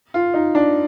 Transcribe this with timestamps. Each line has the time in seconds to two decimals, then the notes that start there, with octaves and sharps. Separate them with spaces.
0.14 F4
0.34 D#4
0.55 D4